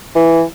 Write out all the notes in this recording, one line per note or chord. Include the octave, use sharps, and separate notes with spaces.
E3